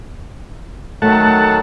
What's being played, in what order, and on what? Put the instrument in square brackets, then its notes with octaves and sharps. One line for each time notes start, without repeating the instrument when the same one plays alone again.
[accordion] D#3 F#3 [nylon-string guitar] A3 [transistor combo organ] F#5 A5